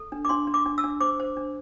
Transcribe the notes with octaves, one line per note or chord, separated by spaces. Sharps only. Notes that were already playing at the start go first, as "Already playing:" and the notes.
Already playing: A4
D4
D6
D4 C6
D4
D6
D4
E6
D4
C5 D6
C5
D4